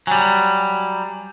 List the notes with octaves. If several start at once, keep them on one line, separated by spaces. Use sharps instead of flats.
F#3 G3 G#5